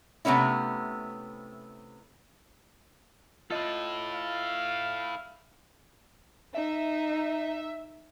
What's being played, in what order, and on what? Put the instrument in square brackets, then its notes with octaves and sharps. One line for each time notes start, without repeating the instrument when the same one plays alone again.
[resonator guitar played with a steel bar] C3 A3 B3 C#4 E4
[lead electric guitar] E4 A4 [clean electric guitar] F4 D#5
[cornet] F5
[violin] D#4 [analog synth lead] E5